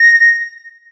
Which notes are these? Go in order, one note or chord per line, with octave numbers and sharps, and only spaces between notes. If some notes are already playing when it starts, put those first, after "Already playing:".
Already playing: A#6